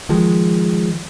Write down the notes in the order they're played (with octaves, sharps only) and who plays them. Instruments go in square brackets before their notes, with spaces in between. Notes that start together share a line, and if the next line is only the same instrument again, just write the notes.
[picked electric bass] D#3 F3 G#3